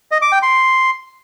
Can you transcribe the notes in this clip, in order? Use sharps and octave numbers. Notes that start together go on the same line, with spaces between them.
D#5
D6
G5
C6